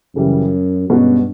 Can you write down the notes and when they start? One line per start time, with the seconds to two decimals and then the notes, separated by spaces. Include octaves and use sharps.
0.15 F#2 C#3 E3 G3
0.89 G2 B2 G#3 C#4 F#4